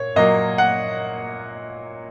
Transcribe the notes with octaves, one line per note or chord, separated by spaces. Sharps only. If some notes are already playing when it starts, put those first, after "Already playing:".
Already playing: A#2 C#5
A#2 F#3 A#3 D#5
F#5